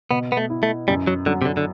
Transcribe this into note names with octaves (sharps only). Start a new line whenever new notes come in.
B2 B3
B3
A3
E4
A3
F#2 G3
F#3
D3 F#3
C3
D3
D3